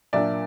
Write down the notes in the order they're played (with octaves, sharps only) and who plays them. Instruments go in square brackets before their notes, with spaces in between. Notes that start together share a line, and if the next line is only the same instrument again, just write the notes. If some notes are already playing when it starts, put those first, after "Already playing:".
[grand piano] A#2 F#3 A#3 D4 D5 E5